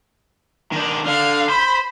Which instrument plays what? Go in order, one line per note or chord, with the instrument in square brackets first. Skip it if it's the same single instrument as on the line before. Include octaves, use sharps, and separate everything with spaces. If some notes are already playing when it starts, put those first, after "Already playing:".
[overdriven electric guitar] D#3 D4
[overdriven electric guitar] D3 [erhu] F5
[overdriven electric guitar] C5 [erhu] B5